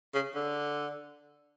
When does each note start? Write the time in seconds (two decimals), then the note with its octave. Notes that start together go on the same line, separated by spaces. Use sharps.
0.14 C#3
0.35 D3